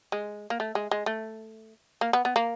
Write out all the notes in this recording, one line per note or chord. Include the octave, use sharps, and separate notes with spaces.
G#3
A#3
A3
G#3
G#3
A3
A#3
B3
B3
A#3